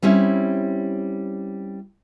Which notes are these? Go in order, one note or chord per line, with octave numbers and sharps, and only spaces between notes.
G3 C4 C#4 E4